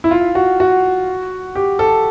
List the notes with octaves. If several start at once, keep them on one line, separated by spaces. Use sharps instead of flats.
E4
F4
F#4
F#4
G4
A4